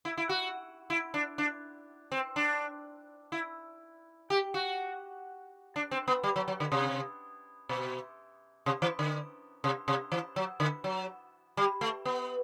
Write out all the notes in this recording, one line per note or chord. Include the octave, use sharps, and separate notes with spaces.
E4
E4
F#4
E4
D4
D4
C4
D4
E4
G4
F#4
D4
C4
B3
G3
F#3
F#3
D3
C3
B2
C3
E3
D3
C3
C3
E3
F#3
D3
F#3
G3
A3
B3